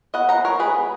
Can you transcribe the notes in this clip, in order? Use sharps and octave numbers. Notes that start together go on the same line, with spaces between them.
B3 D#5 F#5
F3 F#5 A#5
F3 A#4 C#5
G#3 G#4 B4
B3